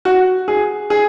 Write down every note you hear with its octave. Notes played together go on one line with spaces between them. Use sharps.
F#4
G#4
G#4